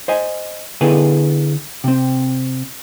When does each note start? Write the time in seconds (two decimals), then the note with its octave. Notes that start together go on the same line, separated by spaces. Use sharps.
0.08 C5 D#5 G#5
0.81 D3 B3 E4 G#4 A4 B4
1.84 C3 C4